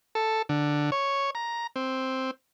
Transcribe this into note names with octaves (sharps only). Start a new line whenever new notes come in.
A4
D3
C#5
A#5
C4